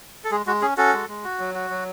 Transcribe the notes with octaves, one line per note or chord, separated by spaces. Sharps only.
A4
G#3 G#4
G#3 F#4
C#4 G#4
C#4 F#4 A4
G#3
G#3
F#4
F#3
F#4
F#3